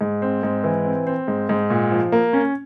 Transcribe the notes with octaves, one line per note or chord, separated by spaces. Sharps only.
G#2
C4
G#2
E3
C4
C4
G#2
G#2
A#2
F3
A#3
C#4